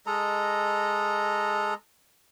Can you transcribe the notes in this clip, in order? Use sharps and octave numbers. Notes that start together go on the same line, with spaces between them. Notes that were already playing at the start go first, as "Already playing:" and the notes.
G#3 A4 D#5 A#5